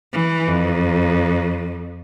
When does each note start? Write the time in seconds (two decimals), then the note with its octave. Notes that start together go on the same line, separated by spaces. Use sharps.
0.13 E3
0.48 F2